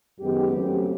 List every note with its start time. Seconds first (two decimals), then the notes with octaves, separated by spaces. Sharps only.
0.19 F#2 D#3 G#3 B3 G4
0.53 F2 C#3 F#3 A3 C4